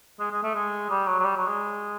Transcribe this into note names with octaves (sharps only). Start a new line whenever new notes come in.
G#3
G#3
A3
G#3
G3
F#3
F#3
G3
F#3
G#3